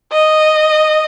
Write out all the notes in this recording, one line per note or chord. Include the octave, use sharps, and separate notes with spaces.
D#5